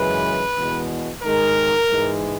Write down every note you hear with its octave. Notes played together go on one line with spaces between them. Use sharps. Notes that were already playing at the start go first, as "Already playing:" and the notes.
Already playing: F#2 C#3 E3 G#3 B4
E2 B2 G#3
G#2 D#3 G#3 A#4
G#2 E3 G#3